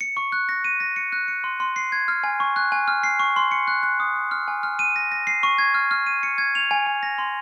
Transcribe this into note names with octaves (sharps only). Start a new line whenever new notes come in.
C#7
C#6
F#6
A#6
D#7
A#6
C#7
F#6
C#7
C6
C6
C7
G#6
F6
G#5
C#6
F#6
G#5
F6
C7
C#6
C6
C#7
F#6
F#6
D#6
D#6
F6
G#5
F6
D#7
A#6
A#6
C7
C#6
G#6
F6
F6
D#7
C#7
G#6
F7
G#5
G#5
A#6
C6